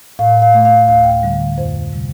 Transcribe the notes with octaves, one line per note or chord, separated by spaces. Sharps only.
A2 F5
F5
A3
F5
D2 F5
G5
F5
D3 G3
F2 C5
C3 G3